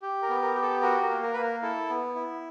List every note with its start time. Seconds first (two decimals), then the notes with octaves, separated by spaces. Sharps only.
0.02 G4
0.22 A#4
0.29 B3
0.43 A#4
0.55 G4
0.62 A4
0.82 F#4 A#4
1.03 A#4
1.09 A#3
1.23 A#4
1.33 A#3 B4
1.42 A#4
1.62 E4 A4
1.89 B3
2.15 E4